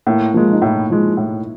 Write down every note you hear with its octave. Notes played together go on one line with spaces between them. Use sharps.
A2 A#3
F3 G#3 A#3
D#4
A2 E4
F3 G#3
A2